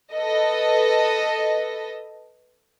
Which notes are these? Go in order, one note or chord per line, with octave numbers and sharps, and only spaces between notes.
A4 B4 D#5